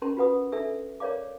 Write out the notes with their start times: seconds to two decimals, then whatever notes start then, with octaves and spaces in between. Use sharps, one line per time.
0.02 C#4 A#4 C6
0.17 F4 F#4 B4 F#5 D#6
0.52 D4 A4 E5 E6
1.00 A#4 C#5 D5 F5 D6